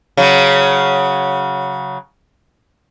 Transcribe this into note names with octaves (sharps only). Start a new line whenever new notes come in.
C#3 F#3